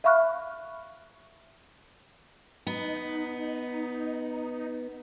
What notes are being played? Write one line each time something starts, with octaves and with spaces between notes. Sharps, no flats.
E5 F5 B5 C#6 F6 F#6
B3 D#4